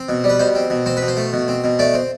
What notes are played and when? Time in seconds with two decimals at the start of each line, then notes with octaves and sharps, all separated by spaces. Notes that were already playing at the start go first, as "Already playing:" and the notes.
Already playing: C4
0.09 B2
0.24 G3
0.29 B4
0.39 B2 C5
0.55 C4
0.70 B2
0.86 C4 C5
0.97 B2 B4
1.08 C5
1.17 A3
1.33 B2
1.48 C4
1.64 B2
1.79 A3 D5
1.94 C4